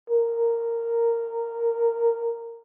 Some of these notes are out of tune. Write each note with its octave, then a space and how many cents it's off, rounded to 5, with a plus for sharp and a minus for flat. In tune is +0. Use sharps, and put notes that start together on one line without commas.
A#4 -10